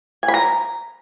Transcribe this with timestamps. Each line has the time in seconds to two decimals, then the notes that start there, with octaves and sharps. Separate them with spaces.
0.23 G#5
0.28 B5
0.34 A#5